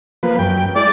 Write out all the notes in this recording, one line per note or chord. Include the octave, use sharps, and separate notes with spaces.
F3 A#3 B4
F#2 G5
G#3 E4 D5